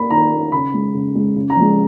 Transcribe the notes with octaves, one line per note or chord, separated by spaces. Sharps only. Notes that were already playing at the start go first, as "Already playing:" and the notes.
Already playing: A#3 B5
D#3 A#5
A#3
C#3 B5
G#3
C#3
G#3
C#3
A#5
F3 G#3